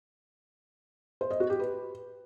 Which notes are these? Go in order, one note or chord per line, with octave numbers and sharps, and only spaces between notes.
C5
D#5
F#4
G4
B4